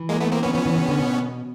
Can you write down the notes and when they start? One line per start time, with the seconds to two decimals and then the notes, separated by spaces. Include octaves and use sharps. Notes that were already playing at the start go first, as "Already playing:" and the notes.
Already playing: E3
0.09 G#3 A#3
0.20 A3 B3
0.32 A#3 C4
0.43 E3 B3 C#4
0.54 F3 B3 C#4
0.66 E3
0.78 C3
0.88 D3
1.00 B2